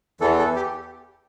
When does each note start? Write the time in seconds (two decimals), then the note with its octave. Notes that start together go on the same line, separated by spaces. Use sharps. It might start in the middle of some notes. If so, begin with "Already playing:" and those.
0.20 E2 E3 A4
0.38 A4
0.56 G4